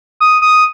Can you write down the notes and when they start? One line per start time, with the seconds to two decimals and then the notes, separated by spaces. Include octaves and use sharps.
0.20 D#6
0.42 D#6